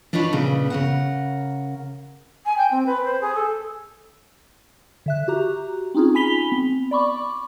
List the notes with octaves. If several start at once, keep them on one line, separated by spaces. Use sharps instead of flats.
D4 D#4 F4 B4 C#5
A#2 C#3 B3
C#3 A#4 F#5
G#5
G5
C4
B4
C5
G#4
A4
D3 E5 F#6
F#4 G4 A#5
C4 C#4 D#4 F4 G#4
G#5 B5 B6 F7 G7
B3 C4
D5 B5 C#6 D6